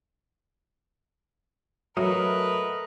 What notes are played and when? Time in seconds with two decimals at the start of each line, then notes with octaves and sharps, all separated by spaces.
1.97 F#3 A3 F#4 A#4 B4 D#5 F5